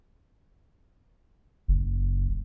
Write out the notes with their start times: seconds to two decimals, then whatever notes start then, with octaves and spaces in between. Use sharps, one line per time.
1.68 F#1